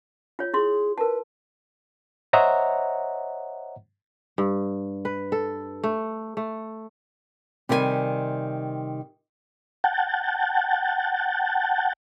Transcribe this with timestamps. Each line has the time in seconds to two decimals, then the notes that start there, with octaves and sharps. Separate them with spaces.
0.39 F4 C#5
0.54 E4 G#4 C6
0.98 A#4 B4 A5
2.33 C5 C#5 D#5 E5 F#5 A#5
4.38 G2
5.05 B4
5.32 A4
5.84 A3
6.37 A3
7.69 C3 D#3 G3 D#5 G#5
9.84 F#5 G5 A5